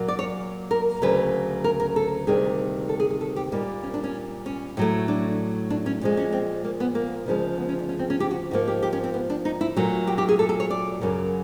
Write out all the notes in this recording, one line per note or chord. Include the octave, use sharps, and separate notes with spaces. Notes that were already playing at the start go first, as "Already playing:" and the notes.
Already playing: A#2 F#3 A#3
D5
C#5
A#4
D2 C#3 F#3 A#3 B4
A#4
A#4
A4
D2 C3 D#3 G3 A#3 G#4
A4
G#4
G#4
A4
G4
A#2 G3 A#3 D#4
C#4
D4
C#4
C#4
A2 F#3 A3
D4
D4
C#4
A#2 F3 G#3
C#4
C4
A#3
B3
A#3
D2 C#3 F3 G#3
B3
C#4
D4
C#4
C4
C#4
G4
F#4
G#2 F3 A#3 F#4
G4
G4
C#4
C4
B3
D4
D#4
E4
A#2 F#3 A3 F#4
G4
G4
G#4
A4
A4
C#5
D5
F#2 C#3 F#3 A#3